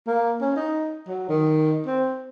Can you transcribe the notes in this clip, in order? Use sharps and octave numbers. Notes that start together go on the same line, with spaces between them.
A#3
C#4
D#4
F#3
D#3
C4